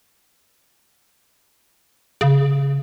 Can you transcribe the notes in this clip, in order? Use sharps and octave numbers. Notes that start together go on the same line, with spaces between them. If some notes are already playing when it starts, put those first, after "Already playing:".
C#3